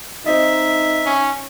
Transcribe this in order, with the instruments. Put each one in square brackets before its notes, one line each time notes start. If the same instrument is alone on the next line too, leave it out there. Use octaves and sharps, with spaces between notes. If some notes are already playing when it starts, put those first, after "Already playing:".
[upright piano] C4 D#5 [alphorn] D#4 [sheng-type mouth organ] E5
[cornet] C#4